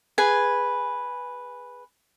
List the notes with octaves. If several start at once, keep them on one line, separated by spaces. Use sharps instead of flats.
G#4 B4 G#5